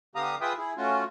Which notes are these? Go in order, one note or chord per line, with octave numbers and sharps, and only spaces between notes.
D3 B3 G4 F5 A#5 D#6
F4 G#4 B4 E5 G5 D#6
E4 G#4
A3 C#4 F4 F#4